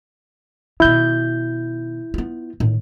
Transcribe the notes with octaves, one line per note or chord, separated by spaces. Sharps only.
B2 D#3 E4 G6
B3 F4
A2 D#3